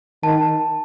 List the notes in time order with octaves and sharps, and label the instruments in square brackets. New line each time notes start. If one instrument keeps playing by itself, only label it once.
[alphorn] D#3 [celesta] A5